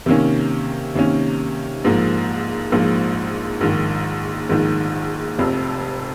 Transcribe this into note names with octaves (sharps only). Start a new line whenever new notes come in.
C3 D#3 A#3 C#4
C3 D#3 A#3 C#4
A#1 G#2 F3 A#3
A#1 G#2 F3 A#3
A#1 G#2 D#3
A#1 G#2 D#3
F1 F2 C3